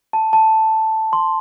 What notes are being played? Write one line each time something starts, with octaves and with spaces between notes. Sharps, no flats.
A5
A5
C6